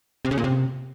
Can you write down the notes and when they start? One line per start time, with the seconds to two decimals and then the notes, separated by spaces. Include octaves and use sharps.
0.25 C3
0.31 C#3
0.37 A#2
0.44 C3